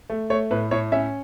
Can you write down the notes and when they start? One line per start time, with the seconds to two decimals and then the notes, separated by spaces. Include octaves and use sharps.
0.10 A3
0.30 A3 C#5
0.51 A2 B4
0.71 A2 C#5
0.92 C#4 E5